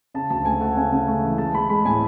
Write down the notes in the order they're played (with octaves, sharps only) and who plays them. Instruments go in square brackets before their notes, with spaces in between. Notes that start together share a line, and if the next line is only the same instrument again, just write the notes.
[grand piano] C#3 A5
D2 A5
A3 G#5
A3 F#5
C#3 G#5
C#3
A3
E3
G#3 A5
G#3 B5
G#3 B5
A2 G#5